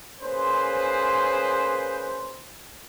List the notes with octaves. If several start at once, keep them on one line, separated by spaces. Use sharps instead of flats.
A#3 C#4 G#4 B4 C5